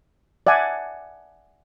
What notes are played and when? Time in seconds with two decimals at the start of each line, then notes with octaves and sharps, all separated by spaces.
0.47 D5 E5 F#5 G#5 A5